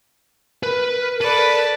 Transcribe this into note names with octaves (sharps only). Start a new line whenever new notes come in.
A#4 B4
A4 B4 D5 B5